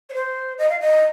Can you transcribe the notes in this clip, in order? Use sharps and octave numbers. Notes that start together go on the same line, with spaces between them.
C#5
C5
D#5
F5
D#5